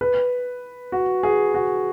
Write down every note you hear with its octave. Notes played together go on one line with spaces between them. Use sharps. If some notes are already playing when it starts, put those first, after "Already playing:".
B4
F#4
G#4
F#4